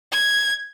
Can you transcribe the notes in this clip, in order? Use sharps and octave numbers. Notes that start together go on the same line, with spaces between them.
G#6